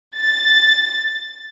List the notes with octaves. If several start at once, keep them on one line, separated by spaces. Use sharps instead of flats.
A6